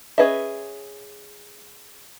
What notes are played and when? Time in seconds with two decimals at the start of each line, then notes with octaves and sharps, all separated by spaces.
0.18 C#4 G#4 B4 D#5 E5